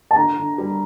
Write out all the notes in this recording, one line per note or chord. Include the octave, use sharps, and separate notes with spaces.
A5
D3 A#5
D3
G3